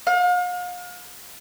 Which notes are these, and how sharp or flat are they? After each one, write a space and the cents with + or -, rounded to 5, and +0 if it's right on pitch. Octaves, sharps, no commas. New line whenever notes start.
F5 +40